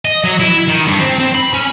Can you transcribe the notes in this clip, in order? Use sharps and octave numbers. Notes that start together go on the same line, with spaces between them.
D#5
F#3
E4
D#3
G2
C4
C4
B5
C#4